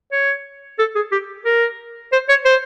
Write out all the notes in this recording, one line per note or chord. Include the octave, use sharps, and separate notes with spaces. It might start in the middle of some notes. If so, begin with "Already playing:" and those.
C#5
A4
G#4
G4
A#4
C5
C#5
C5